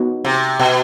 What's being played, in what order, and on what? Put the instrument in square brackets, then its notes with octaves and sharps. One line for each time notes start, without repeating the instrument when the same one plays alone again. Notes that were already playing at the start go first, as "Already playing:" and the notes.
Already playing: [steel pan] B3 D#4 F#4
[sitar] C3
B2